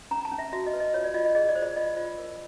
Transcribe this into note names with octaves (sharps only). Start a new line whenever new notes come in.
C#4 A#5
A5
C#4
E5
F#4 E5
D#5
B4
D#5
F4 C#5
D5
F4 D#5
D#5
G#4 D#5
D5
C5
D5
F4 D#5
F4
A#4